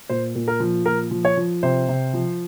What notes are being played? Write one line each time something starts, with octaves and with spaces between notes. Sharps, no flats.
A#2 C5
A#2
A#4
F3
A#2 A#4
F3
C#5
F3
C3 C5
C3
F3